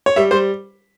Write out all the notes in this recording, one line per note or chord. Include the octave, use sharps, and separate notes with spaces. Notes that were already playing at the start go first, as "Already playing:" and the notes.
C#5
G3 E5
G3 C5